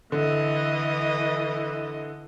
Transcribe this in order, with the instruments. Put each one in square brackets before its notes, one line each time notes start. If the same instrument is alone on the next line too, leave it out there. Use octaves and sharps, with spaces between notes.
[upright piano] D3 [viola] E3 D#5